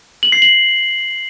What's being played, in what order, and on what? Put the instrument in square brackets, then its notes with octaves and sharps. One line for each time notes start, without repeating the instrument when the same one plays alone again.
[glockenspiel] F#7
C7
F#7